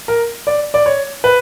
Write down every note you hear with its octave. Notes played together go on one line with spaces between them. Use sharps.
A#4
D5
D5
C#5
B4